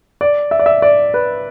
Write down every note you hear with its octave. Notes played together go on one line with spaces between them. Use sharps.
D5
E5
D5
E5
D5
B4